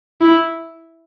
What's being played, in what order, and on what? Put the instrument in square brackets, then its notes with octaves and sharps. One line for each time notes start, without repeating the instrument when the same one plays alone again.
[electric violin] E4